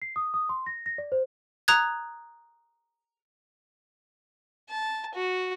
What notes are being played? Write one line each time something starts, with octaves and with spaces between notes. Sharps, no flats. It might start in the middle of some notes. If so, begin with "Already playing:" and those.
C7
D#6
D#6
C6
A#6
A#6
D5
C5
A#5 D#6 F#6 G#6
A5
F#4